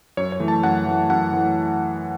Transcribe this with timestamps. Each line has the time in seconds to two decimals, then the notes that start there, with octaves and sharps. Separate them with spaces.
0.17 F#2 C#5
0.32 C#5
0.40 E3 A3
0.48 A5
0.63 F#2 F#5
0.86 E3 A3
1.10 F#2 F#5
1.33 E3 A3